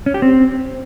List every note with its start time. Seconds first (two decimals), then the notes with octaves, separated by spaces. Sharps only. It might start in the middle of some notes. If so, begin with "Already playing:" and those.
0.06 C#4
0.14 G4
0.22 C4